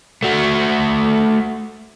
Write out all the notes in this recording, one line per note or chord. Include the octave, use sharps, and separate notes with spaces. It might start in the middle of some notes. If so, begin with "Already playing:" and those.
A3 F#4